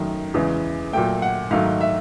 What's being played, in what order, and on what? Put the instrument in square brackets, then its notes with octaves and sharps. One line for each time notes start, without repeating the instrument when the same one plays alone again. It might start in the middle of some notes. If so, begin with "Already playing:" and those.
Already playing: [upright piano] F#2 D#3 F#3 A3
E2 C#3 E3 G#3
A#2 F#3 A3 G5
F#5
G#2 D#3 F#3 A3 F5
E5